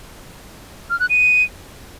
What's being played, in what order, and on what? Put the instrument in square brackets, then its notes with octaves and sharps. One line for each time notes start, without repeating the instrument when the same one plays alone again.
[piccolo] F6
F#6
D#7